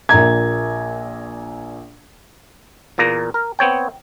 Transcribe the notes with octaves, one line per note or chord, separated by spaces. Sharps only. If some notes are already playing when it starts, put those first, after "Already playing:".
A#1 A#2 A#5 G#6
E2 A#2 A#3 A#5
A#4
B3 C4 C#5 G5